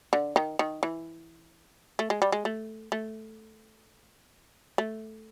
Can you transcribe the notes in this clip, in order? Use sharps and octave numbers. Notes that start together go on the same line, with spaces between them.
D3
D#3
D#3
E3
A3
G#3
G3
G#3
A3
A3
A3